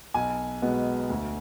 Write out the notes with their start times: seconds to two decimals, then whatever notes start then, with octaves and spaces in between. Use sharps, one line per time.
0.14 B1 G#5
0.62 B2 G#3 B3
1.10 D2